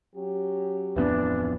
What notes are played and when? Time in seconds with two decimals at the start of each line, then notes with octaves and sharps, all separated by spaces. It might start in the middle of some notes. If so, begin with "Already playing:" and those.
0.15 F#3 C#4 G4
0.96 D1 F2 E3 B3 D4